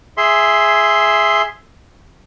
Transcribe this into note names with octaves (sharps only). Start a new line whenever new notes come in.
G#4 E5 C6